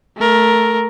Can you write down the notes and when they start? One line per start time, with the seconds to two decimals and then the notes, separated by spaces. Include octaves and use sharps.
0.17 A3 A#4